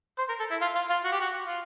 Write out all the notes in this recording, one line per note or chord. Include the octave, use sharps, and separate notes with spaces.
C5
A#4
A4
E4
F4
F4
F4
F#4
G4
F#4
F4